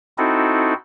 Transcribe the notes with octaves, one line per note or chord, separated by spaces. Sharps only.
C4 D#4 E4 F#4 A4